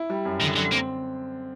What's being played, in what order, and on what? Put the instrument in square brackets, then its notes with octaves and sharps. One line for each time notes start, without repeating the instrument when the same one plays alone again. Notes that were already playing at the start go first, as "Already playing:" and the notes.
Already playing: [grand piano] E4
G3
F#2
[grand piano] D3 [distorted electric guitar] D#3
[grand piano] D3 [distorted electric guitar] F#3
[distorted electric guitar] A#3 [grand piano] C4